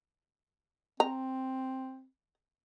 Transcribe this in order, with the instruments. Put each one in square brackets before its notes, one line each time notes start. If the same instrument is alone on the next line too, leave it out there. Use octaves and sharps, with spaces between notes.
[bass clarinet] C4 [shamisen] A#5